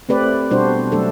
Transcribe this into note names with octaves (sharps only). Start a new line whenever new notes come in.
A3 C4 G4 B4 D5
B2 G3 D4 F#4 C5
F#3 A3 D4 A4